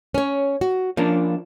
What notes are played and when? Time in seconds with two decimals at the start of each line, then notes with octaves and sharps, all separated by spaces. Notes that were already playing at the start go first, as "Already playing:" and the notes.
0.14 C#4 C#5
0.61 F#4
0.97 F3 A#3 C#4 D4